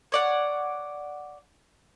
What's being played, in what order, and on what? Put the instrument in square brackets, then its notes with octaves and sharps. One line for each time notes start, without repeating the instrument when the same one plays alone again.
[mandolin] C#5 D5 F#5